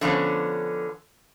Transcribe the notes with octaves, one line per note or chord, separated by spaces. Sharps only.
D3 F3 B3 C#4